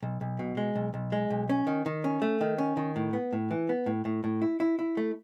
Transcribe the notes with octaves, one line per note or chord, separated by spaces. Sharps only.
B1
B1
B2
G#3
B1
B1
G#3
B1
C#4
D#3
D#3
C#4
A3
D#3
C#4
D#3
A2
B3
A2
E3
B3
A2
A2
A2
E4
E4
E4
A3